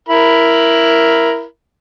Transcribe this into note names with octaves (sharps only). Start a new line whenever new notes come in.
E4 A#4 B5